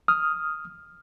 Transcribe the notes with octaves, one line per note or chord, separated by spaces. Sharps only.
D#6 F6